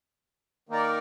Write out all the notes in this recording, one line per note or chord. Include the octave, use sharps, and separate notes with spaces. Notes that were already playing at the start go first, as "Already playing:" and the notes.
D#3 A#3 D#4 A#4 D5